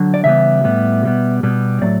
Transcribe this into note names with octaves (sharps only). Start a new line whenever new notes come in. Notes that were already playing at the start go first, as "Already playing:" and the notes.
Already playing: D3 F#3
D5
C#3 E3 G3 B3 E5
A2 G3 B3
B2 G3 B3
B2 G3 B3
A2 F#3 A3 D5